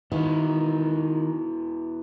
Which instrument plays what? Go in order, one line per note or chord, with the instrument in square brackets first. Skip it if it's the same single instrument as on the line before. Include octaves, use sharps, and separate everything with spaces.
[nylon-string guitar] D#3 [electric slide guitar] B3 E4 F#4